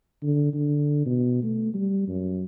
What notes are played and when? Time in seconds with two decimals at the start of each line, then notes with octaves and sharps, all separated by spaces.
0.23 D3
0.53 D3
1.06 B2
1.43 A3
1.74 G3
2.08 F#2